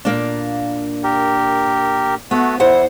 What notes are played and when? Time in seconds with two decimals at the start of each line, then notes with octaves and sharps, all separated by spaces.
0.05 A#2 A#3 D4
1.04 G4 A#4
2.31 A3 B3 F#4
2.60 E2 E4 C5 F#5